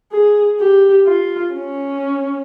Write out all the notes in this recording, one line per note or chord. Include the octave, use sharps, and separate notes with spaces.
G#4
G4
F4
C#4